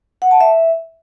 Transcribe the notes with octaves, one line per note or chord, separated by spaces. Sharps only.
F#5
A5
E5